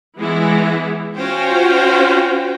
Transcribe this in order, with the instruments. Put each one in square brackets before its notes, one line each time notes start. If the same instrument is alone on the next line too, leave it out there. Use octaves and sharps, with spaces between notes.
[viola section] E3 G#3 B3 E4
C#4 F4 F#4 C5 G5